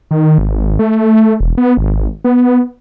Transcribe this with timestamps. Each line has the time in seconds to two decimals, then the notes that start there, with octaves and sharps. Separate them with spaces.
0.11 D#3
0.38 G#1
0.79 A3
1.40 E1
1.58 B3
1.77 G#1
2.24 B3